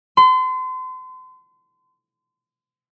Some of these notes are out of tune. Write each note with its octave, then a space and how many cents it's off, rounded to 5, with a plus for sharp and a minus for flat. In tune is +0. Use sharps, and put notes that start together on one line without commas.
C6 -35